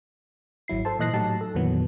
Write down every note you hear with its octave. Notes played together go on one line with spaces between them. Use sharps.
G#1 F#3 E4 C7
A4 C5 A5
A#2 E3 D#5 F#6 A#6 C7
A2 F#3 D#4 G4 A5
A4
F2 A#2 D#3 E3 F#3 B3